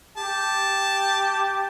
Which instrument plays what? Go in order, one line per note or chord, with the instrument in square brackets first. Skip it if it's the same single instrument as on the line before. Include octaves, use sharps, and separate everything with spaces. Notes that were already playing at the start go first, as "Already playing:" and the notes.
[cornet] G4 [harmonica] A5